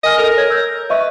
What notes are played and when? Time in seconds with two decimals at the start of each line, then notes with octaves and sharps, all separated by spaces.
0.04 A#4 D#5 G#5 F6
0.18 A4 A#4
0.37 C#5 G#6
0.50 E6 G6
0.90 B4 D#5 E5 C#6